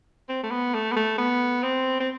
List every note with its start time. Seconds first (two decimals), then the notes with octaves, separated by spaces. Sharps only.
0.29 C4
0.43 A3
0.51 B3
0.74 A3
0.92 B3
0.96 A3
1.18 B3
1.63 C4
2.00 C4